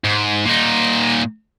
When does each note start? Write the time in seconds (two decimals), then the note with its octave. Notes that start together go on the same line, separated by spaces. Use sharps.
0.04 G#2
0.45 A#2 D#4